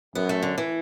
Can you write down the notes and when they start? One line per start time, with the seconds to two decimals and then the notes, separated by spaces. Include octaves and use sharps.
0.15 F#2 B3
0.29 A3
0.43 D3
0.58 E3